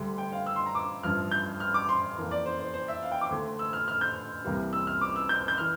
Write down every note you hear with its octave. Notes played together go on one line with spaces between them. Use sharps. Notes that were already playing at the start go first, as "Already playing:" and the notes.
Already playing: D2 D3 G3
G5
F5
E6
C6
A#5
D6
A1 G2 F3 F6
G6
F6
D6
C6
F2 E3 A#3
D5
C5
C5
C5
E5
F5
G5
D6
D2 D3 A3
E6
F6
F6
G6
C2 C3 E3 G3 A#3
E6
F6
D6
E6
G6
G6
E3 F6